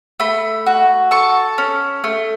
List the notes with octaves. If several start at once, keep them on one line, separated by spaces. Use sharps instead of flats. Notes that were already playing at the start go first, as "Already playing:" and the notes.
A3 B5
F#4
A4 C#6
C#4
A3